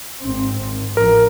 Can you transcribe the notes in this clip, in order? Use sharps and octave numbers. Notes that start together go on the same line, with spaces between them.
G#1 C4
G#1
A1 F3 A#4